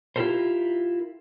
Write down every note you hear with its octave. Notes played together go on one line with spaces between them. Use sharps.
E4 F4 G4 A4 A#4 C5